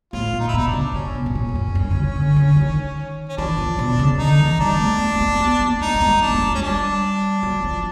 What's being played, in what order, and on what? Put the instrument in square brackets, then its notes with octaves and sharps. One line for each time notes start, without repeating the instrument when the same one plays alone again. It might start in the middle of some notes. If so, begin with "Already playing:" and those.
[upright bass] A2 [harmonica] F4
[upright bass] A#2
[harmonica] D#4
E4
[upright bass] B2 [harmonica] D#4
[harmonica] D4
[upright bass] C#3
[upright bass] C3 [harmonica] C#4
[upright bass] B2
B2
A#2
G2
F#2
G2
D3
C#3
D3
D3
D#3
[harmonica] C#4
[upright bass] E3 [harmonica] D4
[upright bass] F3
B2
C#3
[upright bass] D3 [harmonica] D#4
[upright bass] E3
[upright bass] G3 [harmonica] D4
[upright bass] A3
A3
B3
A#3
B3
A#3
[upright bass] G#3 [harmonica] D#4
[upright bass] F#3
G3
[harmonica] D4
[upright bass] A#3
A3
G#3
[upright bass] F#3 [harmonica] C#4
[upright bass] G3 [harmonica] D4
[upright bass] F#3
F3